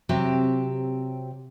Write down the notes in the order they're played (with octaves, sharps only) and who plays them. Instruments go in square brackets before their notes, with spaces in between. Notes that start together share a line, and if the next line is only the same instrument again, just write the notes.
[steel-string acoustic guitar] C3 F#3 C4 G4 E5